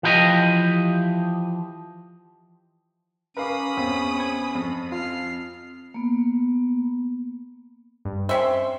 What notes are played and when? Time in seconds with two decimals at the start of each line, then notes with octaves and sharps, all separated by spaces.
0.03 E3 F3 G4 D#5
3.37 C#4 A#4 B4 F5 B5 D6 D#6
3.77 E2 C4 C#5
4.16 C4 C#6 G#6
4.55 F2
4.92 F4 F6 C7
5.94 A#3 B3
8.05 G2
8.29 C4 C#4 C5 E5 C6